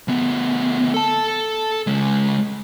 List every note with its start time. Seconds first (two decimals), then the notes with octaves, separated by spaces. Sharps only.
0.08 D2 B3
0.94 A4 A5
1.87 C#3 G#3